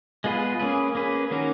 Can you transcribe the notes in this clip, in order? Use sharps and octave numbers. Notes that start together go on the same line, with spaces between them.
G#3 B3 F4 G#4 B4
A#3 C#4 G#4 B4
A#3 C#4 G#4 B4
D#3 A#3 C#4 F#4 A#4